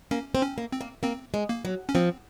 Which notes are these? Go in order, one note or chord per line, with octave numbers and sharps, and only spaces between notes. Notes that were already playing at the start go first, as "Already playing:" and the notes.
A#3 C#4
C4
C#4
A#3
C4
A#3
A#3 C4
G#3
A#3
F#3
C#4
F3 C4